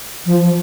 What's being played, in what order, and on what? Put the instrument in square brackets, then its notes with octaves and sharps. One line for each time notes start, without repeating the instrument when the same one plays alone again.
[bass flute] F3